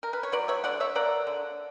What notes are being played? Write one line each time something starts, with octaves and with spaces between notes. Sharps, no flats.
A#4
B4
C#5
F#3 B4 D5
C#5 E5
D3 D5 F#5
C#5 E5
A#3 D5 F#5
D3